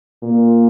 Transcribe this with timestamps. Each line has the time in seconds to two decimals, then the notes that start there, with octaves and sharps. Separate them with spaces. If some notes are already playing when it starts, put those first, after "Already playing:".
0.23 A#2